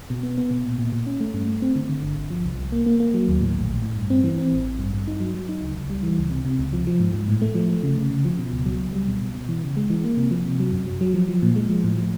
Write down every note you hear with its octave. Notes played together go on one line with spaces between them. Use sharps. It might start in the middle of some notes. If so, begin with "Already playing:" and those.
B2
B3
B3
B2
A#2
A#2
A#2
C#4
A3
G2
A3
C4
D3
D3
G1
G1
F3
C2
C2
A#3
A#3
A#3
F#3
D#2
A2
A#1
A#1
A2
G2
C4
E3
C4
A1
A1
G2
G2
D#4
F#3
F#3
D#4
C#2
C#2
G3
E3
C#2
C3
C3
C#2
F3
F3
G#2
G#2
A2
A3
F3
A3
C#3
C#3
C#3
F3
B2
C#2
F#3
C#2
G3
B2
B2
B2
E3
C#3
G#3
E3
A#3
C3
F3
C3
F#3
F#2
F#3
F#3
F3
F3
A#2
G#3
F3
A2
F3